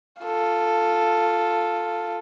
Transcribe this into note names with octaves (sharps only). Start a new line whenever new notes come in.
F4 A4